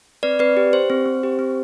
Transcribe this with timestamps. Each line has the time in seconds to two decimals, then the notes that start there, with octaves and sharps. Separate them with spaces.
0.23 C4 B4 D5
0.39 C4 B4 D5
0.57 G4
0.73 G4 C5
0.90 C4
1.06 C4
1.23 G4
1.39 C4